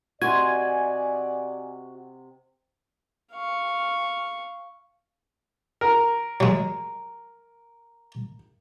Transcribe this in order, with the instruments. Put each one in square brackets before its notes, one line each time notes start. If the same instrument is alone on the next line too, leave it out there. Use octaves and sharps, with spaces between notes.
[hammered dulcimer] C3 D#5 C6 [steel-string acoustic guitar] F#4 [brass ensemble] D5 [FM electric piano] G#5
[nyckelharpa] F5 C#6
[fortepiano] A#4
[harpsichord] F#3 G#3